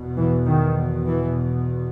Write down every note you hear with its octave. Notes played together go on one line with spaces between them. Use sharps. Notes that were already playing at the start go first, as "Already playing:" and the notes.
Already playing: E2 B2
E3
D#3
E3